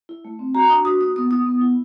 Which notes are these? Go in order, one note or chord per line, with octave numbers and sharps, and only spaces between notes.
E4
A3
C4
F#4 A#5
D4 D#6
F#4 D#6
A#3 D#6
B3 D#6
E4 D#6
B3
E4